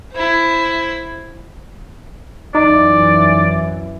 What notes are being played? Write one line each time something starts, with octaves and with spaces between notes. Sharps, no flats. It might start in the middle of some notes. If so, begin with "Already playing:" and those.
E4 C5
F#2 E3 D#4 D5